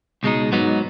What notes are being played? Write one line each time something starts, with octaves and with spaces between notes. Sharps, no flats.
C#2 B2 G#3 D#4
G#2 F#3 B3 D#4